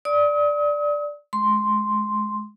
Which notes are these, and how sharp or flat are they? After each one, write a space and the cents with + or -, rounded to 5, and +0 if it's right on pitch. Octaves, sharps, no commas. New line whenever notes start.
D5 +0 D#6 +40
G#3 +25 C6 +0